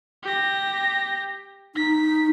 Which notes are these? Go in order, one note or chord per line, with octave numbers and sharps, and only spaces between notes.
G4 A#6
D#4 B6